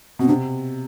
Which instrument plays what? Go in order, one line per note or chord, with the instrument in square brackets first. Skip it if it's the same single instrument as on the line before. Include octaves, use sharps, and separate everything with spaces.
[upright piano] B2 [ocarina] C4
[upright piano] C3 [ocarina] D4